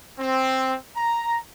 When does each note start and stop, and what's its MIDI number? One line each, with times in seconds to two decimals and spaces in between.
0.19 0.74 60
0.96 1.36 82